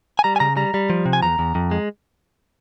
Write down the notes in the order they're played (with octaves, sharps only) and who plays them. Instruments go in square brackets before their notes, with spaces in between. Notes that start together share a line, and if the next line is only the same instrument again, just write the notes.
[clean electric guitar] G#5
G3 A#5
G#5
C#3 A#5
G3 A#5
G3
F3
C3
G#5
E2 A#5
E2
F2
G#3